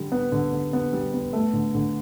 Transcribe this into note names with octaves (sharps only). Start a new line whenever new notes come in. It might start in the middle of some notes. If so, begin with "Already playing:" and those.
Already playing: D3 G3
B3
D3
D3
B3
G3
B3
A3
D3
D3